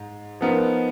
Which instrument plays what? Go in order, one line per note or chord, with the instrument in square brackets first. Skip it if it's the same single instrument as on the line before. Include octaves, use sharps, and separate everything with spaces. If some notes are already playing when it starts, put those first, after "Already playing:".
Already playing: [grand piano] G#2
F3 B3 D#4 A#4